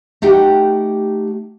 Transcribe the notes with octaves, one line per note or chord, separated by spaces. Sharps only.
A3 D#4 G4 F#5 G5